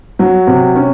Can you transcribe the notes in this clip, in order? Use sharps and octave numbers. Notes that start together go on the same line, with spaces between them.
F#3
C3
C#4